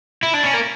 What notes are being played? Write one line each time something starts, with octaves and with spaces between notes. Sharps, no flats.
E4
D4
C#4
A#3